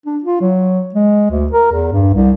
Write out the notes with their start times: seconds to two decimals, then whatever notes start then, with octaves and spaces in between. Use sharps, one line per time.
0.06 D4
0.24 F4
0.41 F#3
0.95 G#3
1.30 D2
1.53 A#4
1.72 E2
1.92 G2
2.14 C2